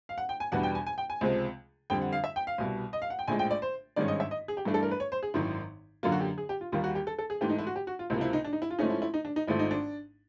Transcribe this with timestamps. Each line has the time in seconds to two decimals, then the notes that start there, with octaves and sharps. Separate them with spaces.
0.09 F5
0.18 F#5
0.29 G5
0.40 G#5
0.52 E2 B2 G3 B3 D4 F#5
0.63 G5
0.75 G#5
0.87 G#5
0.98 G5
1.10 G#5
1.21 C#2 C3 F3 G#3 C4
1.90 F2 D3 G3 C4 G5
2.01 F#5
2.13 F5
2.24 E5
2.36 G5
2.47 F5
2.58 C2 B2 G3
2.93 D#5
3.02 F5
3.10 F#5
3.19 G5
3.28 A#1 A2 F3 G#3 G#5
3.39 G5
3.51 D5
3.62 C5
3.96 G#1 G2 D#3 G#3 C#4 D5
4.08 D#5
4.20 E5
4.31 D#5
4.48 G#4
4.57 G4
4.65 G2 E3 A3 D4
4.74 A4
4.83 A#4
4.91 B4
5.00 C#5
5.12 C5
5.23 G#4
5.34 G#1 F#2 D#3 E4
6.03 F#2 D3 F#3 A#3 F4
6.12 F#4
6.21 G4
6.38 G#4
6.49 G4
6.61 F4
6.72 D#2 D#3 G3 A#3 F4
6.84 F#4
6.95 G4
7.07 A4
7.19 A4
7.30 G#4
7.41 G#2 E3 A3 G4
7.50 D#4
7.59 E4
7.67 F#4
7.76 G4
7.87 F#4
7.99 F4
8.10 C#2 C3 F3 A#3 E4
8.21 E4
8.33 D#4
8.44 D4
8.53 D#4
8.62 E4
8.70 F4
8.78 G#2 F3 A3 C#4 D#4
8.90 E4
9.02 E4
9.14 D#4
9.25 D4
9.36 D#4
9.47 G#1 G#2 F3 A3 E4
9.59 D#4
9.71 D4